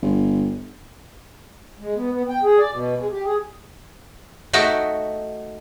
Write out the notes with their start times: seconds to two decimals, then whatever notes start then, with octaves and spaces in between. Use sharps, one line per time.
0.02 G1
1.79 G#3
1.96 B3
2.11 B3
2.29 G5
2.43 G#4
2.58 D5
2.72 B2
2.98 G#3
3.10 G4
3.25 G#4
4.53 A3 D#4 F#4 E5 G5